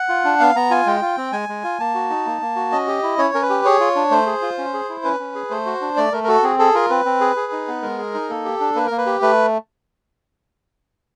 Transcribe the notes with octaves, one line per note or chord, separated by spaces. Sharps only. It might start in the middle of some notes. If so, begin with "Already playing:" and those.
Already playing: F#5
F4
D4
B3 F5
B3 A#5
F4 G#5
G#3 G5
F4
C4
G#3 G#5
G#3
F4
A#3 A5
F#4
D#4
A#3
A#3
F#4
C#4 D#5
G4
E4
C#4 C#5
C#4 A#4
B4
G4
G#4 C#5
F4
D4
A3 C5
G#4
F4
C#4
G#4
E4
C#4 B4
C#4
G#4
A3 C5
F#4
D4
A3 D5
A3 A#4
A#4
F#4 A4
C4 G#4
G#4 A4
F4 A#4
C4 B4
C4
G#4
G#4
D#4
B3
G#3 A#4
G#4
D#4
A#3 A4
G4
D4
A#3 B4
A#3 A#4
B4
G4
A3 B4